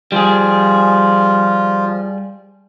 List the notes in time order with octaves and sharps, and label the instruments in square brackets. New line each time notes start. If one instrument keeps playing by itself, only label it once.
[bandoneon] F3 F4 [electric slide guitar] G3 G#4